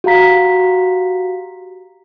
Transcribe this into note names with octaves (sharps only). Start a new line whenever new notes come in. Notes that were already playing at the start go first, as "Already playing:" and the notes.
F#4 G4 F5 A#5 B6